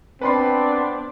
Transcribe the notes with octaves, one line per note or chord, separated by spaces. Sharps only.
B3 C4 D4 B4 D5 B5 C6